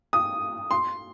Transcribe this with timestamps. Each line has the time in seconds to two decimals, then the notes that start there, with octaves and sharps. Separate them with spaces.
0.13 D#6
0.71 C6